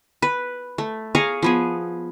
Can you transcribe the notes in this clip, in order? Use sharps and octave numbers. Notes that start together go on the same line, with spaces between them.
B4
A3
G#4 C#5 F5 A#5
F3 B3 G#4